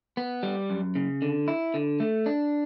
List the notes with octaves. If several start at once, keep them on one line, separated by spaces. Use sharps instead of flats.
B3
G3
F#2
C#3
D3
E4
D3
A3
D4